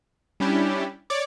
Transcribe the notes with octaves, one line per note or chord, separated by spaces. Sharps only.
G3 C#4 D4 E4 G4
C#5 D5 D6